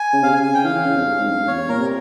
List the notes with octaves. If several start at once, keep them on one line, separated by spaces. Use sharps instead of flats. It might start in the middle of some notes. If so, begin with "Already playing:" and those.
Already playing: G#5
C#3
C3 F5
C#3 G#5
G#5
G5
E3 F5
E3
C#3
F2
G2
G#2
F2
G2
E2 C#5
A#2 A#4
C3